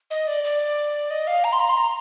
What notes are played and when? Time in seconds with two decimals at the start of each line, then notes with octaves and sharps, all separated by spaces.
0.10 D#5
0.27 D5
0.44 D5
1.10 D#5
1.27 F5
1.44 A#5
1.52 C6
1.60 A#5
1.69 C6
1.77 A#5